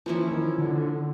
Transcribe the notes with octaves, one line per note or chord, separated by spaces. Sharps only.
E3 F3 A#3 C#4 E4
D#3
D3